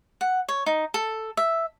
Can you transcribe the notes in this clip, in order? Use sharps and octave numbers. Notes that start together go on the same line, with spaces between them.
F#5
C#5
D#4
A4
E5